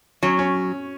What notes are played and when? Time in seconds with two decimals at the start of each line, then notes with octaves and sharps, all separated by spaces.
0.23 F#3 C#4
0.39 C#4